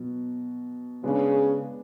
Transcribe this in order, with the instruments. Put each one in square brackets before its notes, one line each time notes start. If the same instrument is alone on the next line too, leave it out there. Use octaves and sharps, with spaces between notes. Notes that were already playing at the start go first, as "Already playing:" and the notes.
Already playing: [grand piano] B2 F#3
[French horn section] C#3 [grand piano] G#3 B3 D4